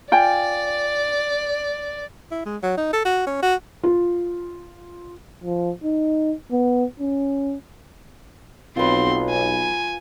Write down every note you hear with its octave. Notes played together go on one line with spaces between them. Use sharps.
F4 D5 G5 G#5
E4
G#3
F#3
D#4
A4
F#4
C#4
F#4
F4
F3
D#4
B3
C#4
B1 C4 F4 B4 C6
G#5